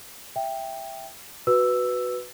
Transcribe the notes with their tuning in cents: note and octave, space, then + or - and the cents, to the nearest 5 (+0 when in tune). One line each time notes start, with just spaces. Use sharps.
E5 +10 G5 +5
F#4 +0 B4 +0 E6 +0